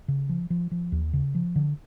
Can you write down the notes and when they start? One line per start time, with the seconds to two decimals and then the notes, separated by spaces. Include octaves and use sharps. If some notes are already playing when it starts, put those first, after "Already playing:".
0.08 C#3
0.29 F3
0.50 F3
0.71 F3
0.92 D#2
1.13 C#3
1.35 F3
1.56 D3